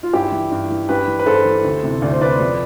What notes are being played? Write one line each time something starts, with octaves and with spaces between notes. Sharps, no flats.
F4
G2 E4 G4
E3
G2
E3
G2 G4 B4
E3
B4
G2 A4 C5
E3
D2
C3 E3
D2 D5
C5
C3 E3 B4 D5
F2